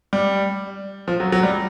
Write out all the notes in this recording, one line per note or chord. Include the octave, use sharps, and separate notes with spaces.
G3
F3
F#3
F#3
G3